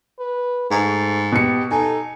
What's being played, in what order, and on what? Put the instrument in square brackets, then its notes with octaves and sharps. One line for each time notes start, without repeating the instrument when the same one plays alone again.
[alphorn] B4
[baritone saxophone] G#2 [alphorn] A3
[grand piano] B2 C#7 [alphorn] G4
[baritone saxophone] D#4 [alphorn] A4 [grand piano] G#5